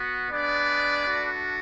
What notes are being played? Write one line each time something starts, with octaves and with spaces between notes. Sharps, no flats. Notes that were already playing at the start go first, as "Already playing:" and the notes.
Already playing: B3 F#4
G#3 B3 D4 B4 D5
A3 D4 F#4